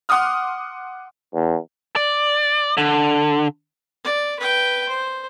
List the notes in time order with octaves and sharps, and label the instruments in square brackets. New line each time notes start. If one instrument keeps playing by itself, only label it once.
[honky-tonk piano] F#5 C6 D6 D#6 F6
[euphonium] E2
[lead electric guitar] D5
D3
[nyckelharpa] D5
B4 G5
C5